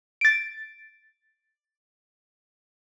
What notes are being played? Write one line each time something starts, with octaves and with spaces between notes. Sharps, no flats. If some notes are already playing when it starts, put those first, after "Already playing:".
A6 D7